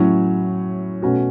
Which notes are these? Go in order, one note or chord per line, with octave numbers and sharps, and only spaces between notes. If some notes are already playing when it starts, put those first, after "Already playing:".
Already playing: A2 F#3 C#4 E4
B2 A3 C#4 F#4